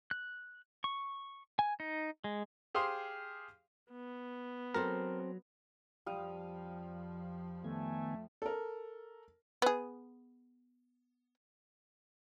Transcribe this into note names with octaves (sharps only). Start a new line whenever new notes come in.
F#6
C#6
G#5
D#4
G#3
G4 G#4 C5 F5 C6 D#6
B3
F#3 C4 A4 A#4 C5
F2 F3 G3 F5 D#6
D#3 A3 B3 G#5
A4 A#4
B3 G#4